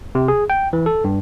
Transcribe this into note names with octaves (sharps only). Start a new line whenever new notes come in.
C3
G#4
G5
E3
A4
G2